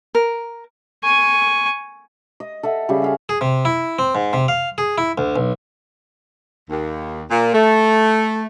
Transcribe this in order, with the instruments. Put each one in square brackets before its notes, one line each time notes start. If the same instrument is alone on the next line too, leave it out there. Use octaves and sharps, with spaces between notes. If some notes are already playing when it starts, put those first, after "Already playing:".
[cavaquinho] A#4
[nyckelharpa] G#5 C#6
[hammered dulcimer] D#5
A4 E5 F#5
C#3 G3 G4
G#4 F5 F#5
[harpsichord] G#4
C3
E4
C4
G#2
C3
F5
G#4
E4
D2
B1
[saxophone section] D#2
A#2
A3